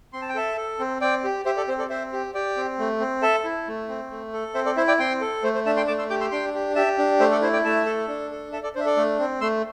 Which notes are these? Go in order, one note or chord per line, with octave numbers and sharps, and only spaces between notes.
C4 C6
A5
G5
A4 E5 A5
A4
C4
C4 D5 G5
G4
G4 C5 E5
A4 D5
C4 C5
A4 D5
C4 C5 E5
G4
G4 D5 G5
C4
A3
C4
A4 E5 A5
E4
A3
C4
A3
A4
C4 C5 E5
A4 D5
E4 C5 E5
D5 G5
C4 G5 C6
A4
A3 C5
C5
D4 E5 A5
G5 C6
A3 A5 D6
C6 E6
G4 D6 G6
C6 E6
D4 G5 C6
G4
G4 E5 A5
D4
A3 C5 E5
A4 D5
E4 C5
D5 G5
A3 E5 A5
A4
D4
A4
A4 E5 A5
A4 D5
D4 C5 E5
A4 D5
A3
C4
A3 C6 E6